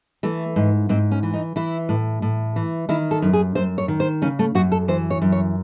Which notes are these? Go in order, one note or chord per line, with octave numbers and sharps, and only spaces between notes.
E3 A3
G#2
G#2 C4
C#4
E3
D#4
E3 E4
A2
A2
E3
D#3 E4
A4
F#2
G#4
F#2 C5
C#5
D#3
C5
C#3 C#4
A3
F#2 F#4
A4
E3 C5
C#5
F#2
C#5